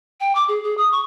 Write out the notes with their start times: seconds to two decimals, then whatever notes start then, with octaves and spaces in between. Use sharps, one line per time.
0.20 G5
0.35 D6
0.48 G#4
0.64 G#4
0.78 D#6
0.92 C#6